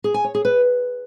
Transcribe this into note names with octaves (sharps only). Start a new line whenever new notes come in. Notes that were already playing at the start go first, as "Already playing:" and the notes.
G#4
G#5
C#5
G#4
B4